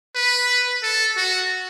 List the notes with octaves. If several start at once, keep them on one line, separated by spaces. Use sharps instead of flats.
B4
A4
F#4